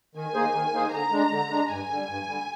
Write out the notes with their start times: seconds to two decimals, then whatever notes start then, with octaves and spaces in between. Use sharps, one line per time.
0.15 D#3 G#5
0.34 A#3 D#4 G#4 C5
0.53 D#3
0.73 A#3 D#4 G#4 C5
0.92 D3 A#5
1.12 G#3 D4
1.31 D3
1.51 G#3 D4
1.70 G2 G#5
1.89 D3 G3
2.08 G2
2.28 D3 G3